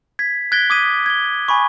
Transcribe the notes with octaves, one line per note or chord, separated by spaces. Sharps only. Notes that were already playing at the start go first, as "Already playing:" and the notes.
G#6 B6
F#6 G#6 A6 B6 D7 G7
D6 D#6 G#6 B6 D#7
G#6 G7
G#5 B5 C#6